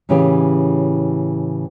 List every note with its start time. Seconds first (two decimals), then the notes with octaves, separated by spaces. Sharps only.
0.09 A2 C#3 E3 C#4 G4 G#4